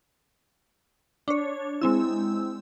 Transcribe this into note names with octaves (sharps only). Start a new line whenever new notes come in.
D4 C#5
G#3 C4 E4 E6